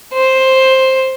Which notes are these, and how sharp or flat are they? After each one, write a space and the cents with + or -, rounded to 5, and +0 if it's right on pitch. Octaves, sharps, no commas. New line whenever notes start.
C5 +5